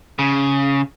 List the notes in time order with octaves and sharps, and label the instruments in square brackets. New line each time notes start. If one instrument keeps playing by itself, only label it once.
[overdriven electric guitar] C#3